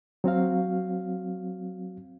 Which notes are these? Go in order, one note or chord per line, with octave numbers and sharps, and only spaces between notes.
F#3 C4 F#4 F5